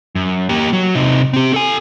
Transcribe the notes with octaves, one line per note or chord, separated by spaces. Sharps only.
F#2
A#3 G4
F#3
C3 D#4
C4 G4
A4 G#5